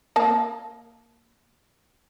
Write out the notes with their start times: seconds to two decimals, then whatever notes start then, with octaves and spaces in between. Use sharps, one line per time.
0.16 A#3 A5